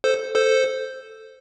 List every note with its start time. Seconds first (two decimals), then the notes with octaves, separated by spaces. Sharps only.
0.04 A4 C5
0.35 A4 C5